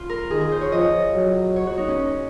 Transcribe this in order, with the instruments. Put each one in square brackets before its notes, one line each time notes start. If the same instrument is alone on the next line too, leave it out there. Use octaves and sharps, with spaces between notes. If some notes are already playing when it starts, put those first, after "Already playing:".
Already playing: [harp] F4
A#4
[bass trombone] D#3 [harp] G#4
[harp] G#4
C5
C#5
[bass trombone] F3 [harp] D#5
[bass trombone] F#3
[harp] C#5
F#4
D#4
C#4